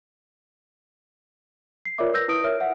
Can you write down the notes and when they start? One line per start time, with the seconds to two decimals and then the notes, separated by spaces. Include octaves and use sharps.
1.85 C7
1.98 F4 A#4 C#5 D5 E5 D6
2.13 A#4 B4 E6 G6 A#6
2.28 E4 B4 D#6 D7
2.44 A#4 C#5 E5 F6
2.60 E5 F#5